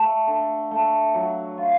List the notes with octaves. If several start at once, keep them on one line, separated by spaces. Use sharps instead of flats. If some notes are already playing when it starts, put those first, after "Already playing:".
Already playing: A3
D3
A3
F#3
F4